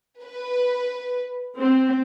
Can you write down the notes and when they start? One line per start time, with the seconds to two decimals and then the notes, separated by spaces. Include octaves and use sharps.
0.22 B4
1.57 C4